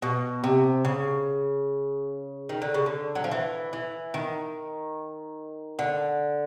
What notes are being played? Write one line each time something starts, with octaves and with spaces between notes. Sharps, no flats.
B2
C3
C#3
D#3
D3
C#3
D3
F#3
F3
E3
E3
D#3
D3